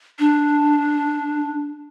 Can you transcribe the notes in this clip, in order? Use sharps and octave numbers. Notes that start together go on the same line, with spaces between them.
D4